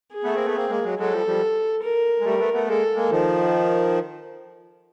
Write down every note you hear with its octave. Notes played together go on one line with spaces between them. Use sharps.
G#4
A3 B3
A#3 C4
A3 B3
A#3 C4
G#3 A#3
F#3 G#3
F#3 G#3 A4
F3 G3
F3 G3
A#4
G#3
G3 A3
A3 B3
A3 B3
G#3 A#3 A4
G#3 A#3
D#3 F3